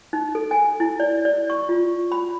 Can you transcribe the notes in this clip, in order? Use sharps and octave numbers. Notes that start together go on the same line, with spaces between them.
D#4
A4
G#5
E4
D5
D5
C#6
F4
B5